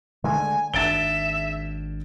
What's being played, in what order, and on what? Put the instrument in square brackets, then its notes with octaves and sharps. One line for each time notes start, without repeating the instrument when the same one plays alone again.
[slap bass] D3 G#3 A3 [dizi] G#5
[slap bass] G#1 D4 [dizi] E5 [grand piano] A6 D7 G7